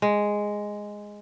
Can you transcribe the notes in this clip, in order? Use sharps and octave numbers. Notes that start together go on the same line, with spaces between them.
G#3